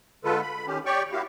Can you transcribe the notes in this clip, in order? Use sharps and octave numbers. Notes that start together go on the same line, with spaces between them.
D3 G#3 F4 A4 B4
B5
D#3 C#4 G4
G4 C#5 D5 G5 C#6
A#3 E4 F#4 G4 F5